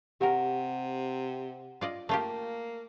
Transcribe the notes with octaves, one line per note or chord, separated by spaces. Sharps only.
C3 C4 G4 A#4 F#5
F4 D5 D#5
A3 A#3 F4 G4